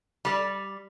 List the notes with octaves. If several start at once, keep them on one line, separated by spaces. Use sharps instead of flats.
G3 D5